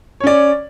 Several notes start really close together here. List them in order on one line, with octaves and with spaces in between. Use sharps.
C#5 C#4 D5